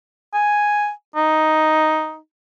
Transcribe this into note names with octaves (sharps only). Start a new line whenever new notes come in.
G#5
D#4